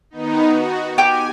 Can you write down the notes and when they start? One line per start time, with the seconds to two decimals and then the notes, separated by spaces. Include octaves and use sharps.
0.10 D#3 B3 D#4
0.44 F#4
0.98 G4 G5 G#5